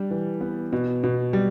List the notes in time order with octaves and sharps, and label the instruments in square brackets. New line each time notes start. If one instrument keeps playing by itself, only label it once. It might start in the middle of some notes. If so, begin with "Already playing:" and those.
Already playing: [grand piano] G3 D4
E3
B3
B2
B2
G3